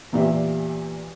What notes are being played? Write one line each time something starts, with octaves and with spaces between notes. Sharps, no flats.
E2 A#2 G4 D5 E5